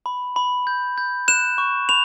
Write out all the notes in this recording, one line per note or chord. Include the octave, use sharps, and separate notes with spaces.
B5
B5
G6
G6
F#6 E7
C#6
B5 F7